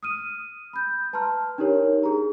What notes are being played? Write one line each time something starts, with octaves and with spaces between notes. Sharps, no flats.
D#6 F6 D#7
B5 G6
B4 A5 A#5 C6 F6
D4 D#4 G4 A#4 C#5
G#4 A#5